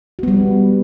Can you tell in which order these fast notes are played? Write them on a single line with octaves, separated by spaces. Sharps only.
F#4 B3 G3